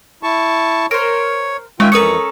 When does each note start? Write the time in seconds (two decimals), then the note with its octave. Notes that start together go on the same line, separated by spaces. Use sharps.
0.23 E4 A5 C#6
0.91 A#4 C5 C#5 D7
1.80 D#3 G#3 C#4 F4 D#5 E5 G5
1.92 F2 E3 C#4 A4 A#4 A#5 D#6 C#7